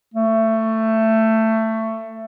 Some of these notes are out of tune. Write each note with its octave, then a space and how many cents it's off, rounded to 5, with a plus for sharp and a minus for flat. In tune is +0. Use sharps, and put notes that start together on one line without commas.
A3 +15